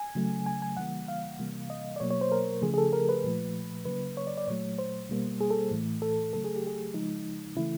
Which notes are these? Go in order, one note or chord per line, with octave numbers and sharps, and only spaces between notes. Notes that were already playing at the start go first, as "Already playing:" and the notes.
Already playing: G#5
C#3 F#3 A3
G#5
G#5
C#3 E3 G3 A#3 F#5
F5
C3 E3 G3 A#3
D#5
D5
B2 F#3 A#3 C#5
C#5
C5
A#4
C#3 F3 A3 G#4
G#4
A4
A#4
B4
A#2 F3 A3
C#3 F#3 A#3 B4
C#5
D5
D5
A#2 F#3 A3 C#5
C5
B2 G3 A#3
G#4
A4
A2 E3 A3
A4
C#3 F#3 A3 A4
G#4
G4
G#4
C#3 F3 G#3 D#4
C#3 E3 A3 E4